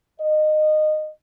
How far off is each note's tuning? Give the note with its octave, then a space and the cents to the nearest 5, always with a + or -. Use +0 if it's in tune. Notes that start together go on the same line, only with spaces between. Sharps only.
D#5 -20